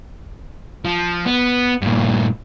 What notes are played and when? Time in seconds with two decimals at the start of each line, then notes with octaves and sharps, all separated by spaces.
0.85 F3
1.26 B3
1.81 G2 A#2